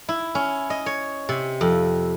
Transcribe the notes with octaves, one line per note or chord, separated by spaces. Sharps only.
E4
C#4
D#5
C#5
C3
F2